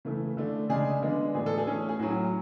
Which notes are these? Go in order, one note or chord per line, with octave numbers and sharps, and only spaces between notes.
C#3 E3 A3
D3 A3 D4
C#3 G#3 D4 G#4
D3 G#3 B3 D4
A2 E3 B3 D4 G#4
A4
G#4
E3 A3 C#4
G#4
A2 F#3 C#4 F#4